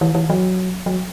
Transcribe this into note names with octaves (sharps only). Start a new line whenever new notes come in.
E3
E3
F#3
F#3